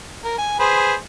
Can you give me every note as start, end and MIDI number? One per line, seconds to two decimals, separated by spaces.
0.24 0.35 70
0.38 0.56 80
0.60 0.95 68
0.60 0.95 71
0.60 0.95 72